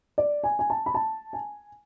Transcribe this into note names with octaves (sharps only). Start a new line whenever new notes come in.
D5
G#5
G#5
A5
B5
A5
G#5